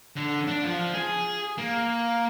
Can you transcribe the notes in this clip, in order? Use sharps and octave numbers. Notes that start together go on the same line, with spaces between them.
D3
D4
F3
G#4
A#3